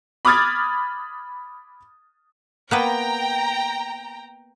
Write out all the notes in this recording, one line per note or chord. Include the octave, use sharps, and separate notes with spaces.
B5 D6 D#6 F6 G#6 A6
A#3 B3 B4 G5 A#5